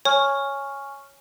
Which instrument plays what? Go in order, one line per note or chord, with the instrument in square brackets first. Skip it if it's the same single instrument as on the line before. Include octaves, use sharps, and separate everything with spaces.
[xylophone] C#5 [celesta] G#5 C#6 F6